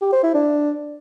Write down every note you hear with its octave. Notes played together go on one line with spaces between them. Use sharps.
G4
C5
E4
D4